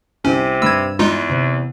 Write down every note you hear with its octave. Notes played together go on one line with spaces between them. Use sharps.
C2 C3 C#4 D7
G2 B5 E6 G#6 E7
E2 G#3 D#4 F4
C3